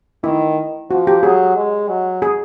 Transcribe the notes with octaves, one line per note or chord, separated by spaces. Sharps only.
D#3 E4
F3 F#4
G4
F#3 G#4
G#3
F#3
G#4